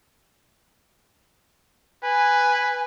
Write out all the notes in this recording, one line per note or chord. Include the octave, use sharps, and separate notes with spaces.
B4 G#5